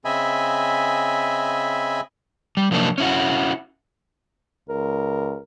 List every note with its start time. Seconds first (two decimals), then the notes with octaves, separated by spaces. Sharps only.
0.05 C#3 C4 D#5 E5 G#5 B5
2.57 G3
2.71 C3 F3 F#3 A#3 D4 D#4
2.98 C#4 E4 F#4
4.69 C#2 A#4